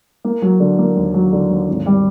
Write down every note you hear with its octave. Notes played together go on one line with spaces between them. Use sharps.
A#3
F#3
D3
A#3
D#2
F#3
D3
D#2
G#1
G3